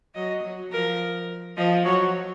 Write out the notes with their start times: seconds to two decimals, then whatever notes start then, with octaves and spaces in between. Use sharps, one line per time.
0.15 F#3 D#5
0.43 F#3
0.72 F3 A#4
1.57 F3 D#5
1.85 F#3 C#5